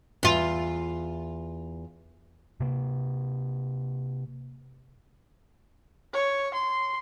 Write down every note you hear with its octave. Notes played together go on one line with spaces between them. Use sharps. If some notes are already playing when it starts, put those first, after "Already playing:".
E2 F4
C3 A#3
C#5
C6